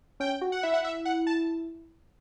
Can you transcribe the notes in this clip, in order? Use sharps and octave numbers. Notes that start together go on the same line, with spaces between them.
C#4 G5
F#4
F#5
E4 E5
F#5
E5
F#5
A5